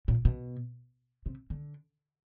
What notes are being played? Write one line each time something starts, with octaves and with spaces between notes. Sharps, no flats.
A#2
B2
C3
D3